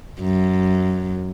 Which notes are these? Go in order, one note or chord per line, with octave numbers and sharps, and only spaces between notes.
F#2